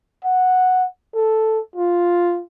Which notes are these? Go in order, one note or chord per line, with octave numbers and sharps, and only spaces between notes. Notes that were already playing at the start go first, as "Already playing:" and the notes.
F#5
A4
F4